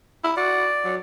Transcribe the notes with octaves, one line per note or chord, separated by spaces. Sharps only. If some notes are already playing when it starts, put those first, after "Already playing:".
E4
F#4 D5
F#3